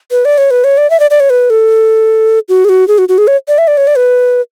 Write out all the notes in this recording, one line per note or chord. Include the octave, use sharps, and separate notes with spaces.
B4
D5
C#5
B4
C#5
D5
E5
D5
D5
C#5
B4
A4
F#4
G#4
F#4
G#4
F#4
F#4
G#4
C#5
D5
E5
D5
C#5
D5
B4